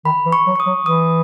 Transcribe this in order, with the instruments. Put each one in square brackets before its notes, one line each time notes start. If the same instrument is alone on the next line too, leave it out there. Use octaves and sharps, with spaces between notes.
[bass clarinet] D#3 [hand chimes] B5
[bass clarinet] E3
[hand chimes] C#6
[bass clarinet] F#3
[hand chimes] C#6
D#6
[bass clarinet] F#3
[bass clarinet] E3 [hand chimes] D#6